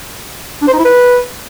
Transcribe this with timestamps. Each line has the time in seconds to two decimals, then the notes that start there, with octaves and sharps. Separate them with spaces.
0.62 D4
0.68 C5
0.73 D#4
0.79 E4
0.85 B4